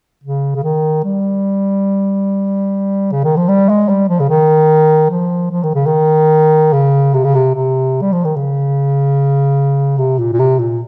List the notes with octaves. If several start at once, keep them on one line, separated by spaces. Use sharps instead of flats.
C#3
C#3
D#3
G3
C#3
D#3
F3
G3
G#3
G3
F3
C#3
D#3
F3
F3
D#3
C#3
D#3
C#3
C3
C#3
C3
C3
G3
F3
D#3
C#3
C3
A#2
A#2
C3
A#2